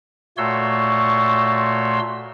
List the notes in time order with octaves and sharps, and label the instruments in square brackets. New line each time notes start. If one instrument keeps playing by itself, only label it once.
[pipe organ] A#2 A3 F#4 C#5 C6 E6